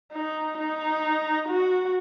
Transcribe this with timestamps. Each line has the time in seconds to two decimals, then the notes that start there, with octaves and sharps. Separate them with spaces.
0.12 D#4
0.58 D#4
1.48 F#4